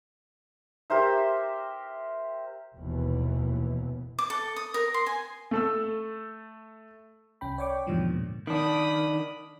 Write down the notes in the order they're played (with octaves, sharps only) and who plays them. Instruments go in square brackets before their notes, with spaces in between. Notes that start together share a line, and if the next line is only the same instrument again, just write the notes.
[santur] G4 A#4 C5 E5
[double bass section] F1 D#2 B2 E3
[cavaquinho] D6
A4
D#6
A#4
C6
G#5
[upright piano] A3 A4 E6
[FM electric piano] C2 C#4 G5 B5
C#5 D5 G5 C#6 D6
E2 G#2 B2 D3 F3 G3
A#2
[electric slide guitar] D#3 D4 [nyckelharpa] B5 D#6